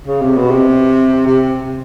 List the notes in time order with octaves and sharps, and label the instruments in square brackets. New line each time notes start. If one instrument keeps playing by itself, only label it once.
[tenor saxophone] C#3
C3
B2
C3
C3